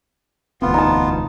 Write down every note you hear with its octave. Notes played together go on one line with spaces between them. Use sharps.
E1 D2 B3 C4 F4
D#4 A5